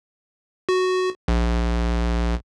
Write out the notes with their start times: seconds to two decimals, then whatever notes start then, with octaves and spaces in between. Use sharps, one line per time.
0.69 F#4
1.28 A#1